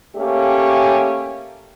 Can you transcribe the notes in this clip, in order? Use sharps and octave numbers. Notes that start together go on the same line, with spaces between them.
A3 A#3 C#4 G4